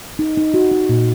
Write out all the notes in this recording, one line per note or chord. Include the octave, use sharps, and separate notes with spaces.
D#4
D#4
F#4
D#4
A#2